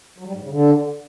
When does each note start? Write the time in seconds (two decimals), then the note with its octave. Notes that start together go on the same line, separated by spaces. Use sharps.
0.18 F#3
0.26 G3
0.35 G#2
0.43 C#3
0.51 D3